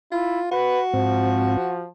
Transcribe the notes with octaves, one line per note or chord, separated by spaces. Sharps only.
E4 F4
F#4 B4
G#2 F3 C4